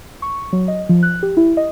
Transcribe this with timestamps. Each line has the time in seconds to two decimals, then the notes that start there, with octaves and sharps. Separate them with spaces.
0.22 C#6
0.53 F#3
0.68 D#5
0.89 F3
1.03 F#6
1.23 G4
1.37 E4
1.57 D#5